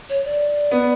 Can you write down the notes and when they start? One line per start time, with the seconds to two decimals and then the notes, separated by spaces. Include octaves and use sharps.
0.09 C#5
0.25 D5
0.71 B3